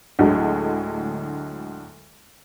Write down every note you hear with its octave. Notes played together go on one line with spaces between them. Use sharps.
D2 A2 D3 F#3 G#3